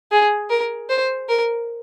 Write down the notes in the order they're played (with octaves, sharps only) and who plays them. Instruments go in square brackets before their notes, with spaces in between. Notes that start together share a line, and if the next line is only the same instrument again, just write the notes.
[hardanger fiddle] G#4
A#4
C5
A#4